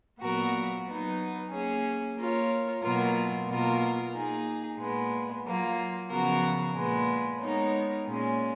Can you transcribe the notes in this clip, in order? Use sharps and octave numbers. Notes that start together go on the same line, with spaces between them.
A#2 F#3 B3 F#4 A#4
F#3 B3 D#4
A#3 C#4 G#4 C#5
A#3 F4 A#4 C#5
B2 F#3 A#3 F4 A#4
B2 A#3 F4 A#4
A#3 D#4 G#4
A#2 G#3 B3
F#3 A#3 F4
C#3 F3 B3 F#4 A#4
A#2 G#3 B3
G#3 B3 D#4 A#4 C#5
A#2 G#3 C#4